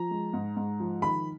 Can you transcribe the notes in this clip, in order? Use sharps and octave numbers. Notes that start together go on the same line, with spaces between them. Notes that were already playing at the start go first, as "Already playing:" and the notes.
Already playing: F3 A#5
G#3
G#2
G#2
F3
D#3 B5